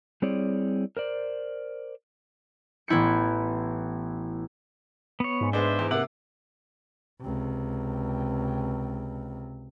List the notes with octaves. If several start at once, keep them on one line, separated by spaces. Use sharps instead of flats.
G3 C4 E4 G#4 C#5 D5
A#4 C5 D5
A1 B3 E4 G6 C#7
B3 C#5
G#2
G#3 B3 D4 C5 E5
E2
C3 A#3 F#5
C#2 C3